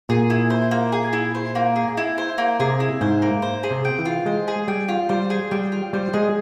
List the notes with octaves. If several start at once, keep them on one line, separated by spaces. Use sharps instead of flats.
A#2 G#4
E4
C5
A#3
G#4
E4
C5
A#3
G#4
E4
C5
A#3
C3 G#4
E4
G#2 C5
A#3
C5
G#4
C3
G5
E3
F4
G#3 C5
G#4
G3 G5
F4
G3 C5
G#4
G3 G5
F4
G3 C5
G#3 G#4